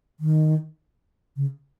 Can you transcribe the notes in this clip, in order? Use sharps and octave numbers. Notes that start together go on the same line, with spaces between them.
D#3
C#3